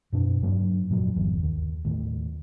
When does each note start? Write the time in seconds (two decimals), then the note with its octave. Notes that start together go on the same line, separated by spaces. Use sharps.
0.13 F#2 B2 D4
0.42 G2 F#3 A#3 D4
0.90 F2 A#2 F#3
1.16 G1 E2
1.43 D#2
1.85 D#2 A2